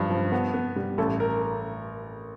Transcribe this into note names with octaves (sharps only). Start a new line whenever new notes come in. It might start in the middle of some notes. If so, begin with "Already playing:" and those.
Already playing: G2 F3
F3
B3
B3
G3
A1 A4
A#4